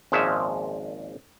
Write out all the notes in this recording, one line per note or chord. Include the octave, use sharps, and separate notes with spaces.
G#1 A#2 F3 G#3 C#4 E5